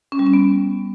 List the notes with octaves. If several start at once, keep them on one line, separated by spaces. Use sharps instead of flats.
C#4
G3
C#4
B3